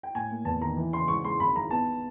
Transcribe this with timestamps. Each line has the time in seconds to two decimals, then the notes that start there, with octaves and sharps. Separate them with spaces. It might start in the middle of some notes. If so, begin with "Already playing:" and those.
0.03 G5
0.15 A2 G#5
0.31 A#3
0.45 E2 A5
0.61 D#3 A#5
0.77 E3
0.93 C#3 C6
1.08 G#2 C#6
1.24 G#3 C6
1.40 G#1 B5
1.56 G#1 A#5
1.71 B3 A5